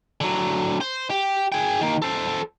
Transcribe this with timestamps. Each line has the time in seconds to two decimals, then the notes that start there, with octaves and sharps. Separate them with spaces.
0.21 D3 F#3
0.81 C5
1.10 G4
1.52 G#4 G5
1.81 D#3 A#3
2.02 A4 C5